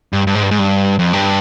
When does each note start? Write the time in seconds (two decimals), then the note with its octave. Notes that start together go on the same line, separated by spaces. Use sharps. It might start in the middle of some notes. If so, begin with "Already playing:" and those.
0.13 G2
0.27 G2
0.35 G#2
0.43 G2
0.51 G#2
0.59 G2
0.99 F2
1.13 G2